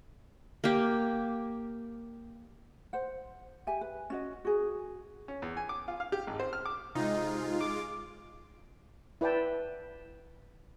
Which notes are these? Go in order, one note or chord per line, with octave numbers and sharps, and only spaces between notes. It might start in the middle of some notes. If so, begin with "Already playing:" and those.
A#3 G4
C5 F#5
G4 E5 G#5
B4
C#4 F#4 D#5
F#4 G#4
C#4
E2
G#5
D6
F4
F5
G4
G#1
C5
F6
D6
C3 G#3 D#4 F4
D6
E4 B4 D5 G5 A5